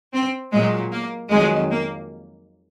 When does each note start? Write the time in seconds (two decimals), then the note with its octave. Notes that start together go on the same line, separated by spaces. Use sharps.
0.13 C4
0.52 A#2 F#3 G#3
0.92 A#3
1.31 F2 D#3 F#3 G#3
1.70 A#3